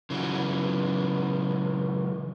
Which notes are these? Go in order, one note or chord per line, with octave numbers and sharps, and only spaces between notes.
C#3 E3 F#3